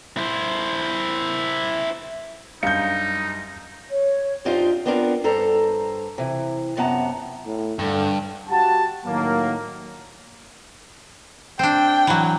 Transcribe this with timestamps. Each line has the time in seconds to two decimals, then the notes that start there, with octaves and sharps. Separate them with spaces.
0.17 E4 C5
2.63 F#2 G3 D4 D#4 F5 G6 C#7
3.90 C#5
4.45 F#2 C4 D4 D#4 F4 G4
4.85 B3 C4 D4 F4 G#4 A#4
5.24 G2 A4 C5 A#5
6.18 C3 E3
6.77 F#2 C3 B3 F#5 A5 A#5
7.45 A2
7.79 G2 D3
8.49 F#4 G4 F#5 A5
9.06 A2 D#3 F#3 A#3
11.59 C4 D4 G5
12.07 E3 F#3